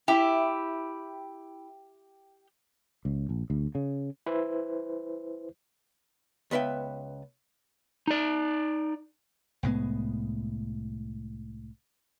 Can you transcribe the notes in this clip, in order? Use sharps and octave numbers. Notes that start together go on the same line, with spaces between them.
E4 G4
C#2
A#1
D2
C#3
E4 B4 C5
C#2 B3 B4 E5 G5
D#4 D5
C2 A2 G#3 B3